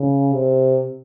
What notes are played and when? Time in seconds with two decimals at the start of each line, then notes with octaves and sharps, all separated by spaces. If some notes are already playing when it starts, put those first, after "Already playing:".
Already playing: C#3
0.33 C3